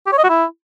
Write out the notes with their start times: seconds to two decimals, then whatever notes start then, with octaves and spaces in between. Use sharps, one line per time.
0.07 G4
0.13 C#5
0.18 D#5
0.24 F#4
0.30 E4